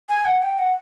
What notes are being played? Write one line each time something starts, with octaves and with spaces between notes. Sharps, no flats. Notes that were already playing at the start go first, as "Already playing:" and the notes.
G#5
F#5
G5
F#5